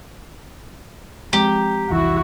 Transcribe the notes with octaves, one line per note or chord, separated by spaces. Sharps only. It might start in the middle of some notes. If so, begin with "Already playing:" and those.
F3 G#3 C4 G4 A#5
F1 C2 E3 E4 F#4